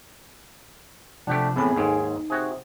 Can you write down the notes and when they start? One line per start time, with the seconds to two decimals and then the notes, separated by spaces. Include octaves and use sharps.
1.27 C3 F3 A3 D4 G4 F#5
1.56 A2 E3 B3 C4 G#4 B5
1.76 D#2 G#2 A4
1.99 D#4
2.30 C3 F#4 G#4